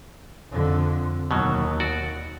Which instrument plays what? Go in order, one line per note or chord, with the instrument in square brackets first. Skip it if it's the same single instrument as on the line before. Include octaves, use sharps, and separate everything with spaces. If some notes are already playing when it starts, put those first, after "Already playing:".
[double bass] F2 D3
[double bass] D#2 [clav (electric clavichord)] B2 F#3
[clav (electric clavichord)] F#4 D5